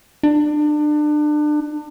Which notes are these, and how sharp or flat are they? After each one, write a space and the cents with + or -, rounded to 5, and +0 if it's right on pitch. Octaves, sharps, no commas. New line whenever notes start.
D4 +30